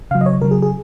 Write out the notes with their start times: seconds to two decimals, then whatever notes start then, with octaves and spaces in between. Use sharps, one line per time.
0.11 C#3 F#3 F5
0.21 D#5
0.26 C#5
0.42 C#3 F#3 A#4
0.51 G#4
0.62 G#4